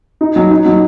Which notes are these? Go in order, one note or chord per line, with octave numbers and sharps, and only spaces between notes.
D#4
F#3
D#4
F#3